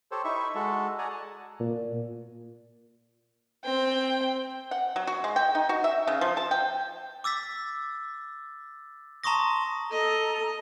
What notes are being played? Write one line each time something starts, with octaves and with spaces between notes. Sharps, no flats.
G4 A4 C5 C#5
D#4 E4 E5 C#6
G#3 F#4 A4
G#4 D5 F#5 G#5 A#5
A5
A#2
C4 G5
F#5
F#3
F#4
G#3
G5
D#4
F#4
E5
C#3
F3
A5
G5
D6 E6 A6 B6
A5 A#5 C6 C#6 D#6 A#6
A4 D#5 A#5